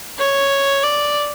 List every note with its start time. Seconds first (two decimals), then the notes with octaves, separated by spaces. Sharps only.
0.19 C#5
0.83 D5